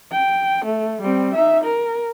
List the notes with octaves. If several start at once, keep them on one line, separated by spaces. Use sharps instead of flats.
G5
A3
G3 C4
D#4 E5
A#4